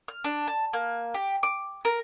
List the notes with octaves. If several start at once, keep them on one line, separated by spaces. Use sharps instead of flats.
F6
D4
A5
A#3
G4
D6
A#4